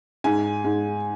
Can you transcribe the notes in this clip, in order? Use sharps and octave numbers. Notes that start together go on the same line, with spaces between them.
G#2 G#5
G#2